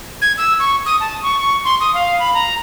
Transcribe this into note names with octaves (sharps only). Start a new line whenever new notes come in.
G#6
E6
C#6
D#6
A5
C#6
C#6
C6
D#6
F5
B5
A#5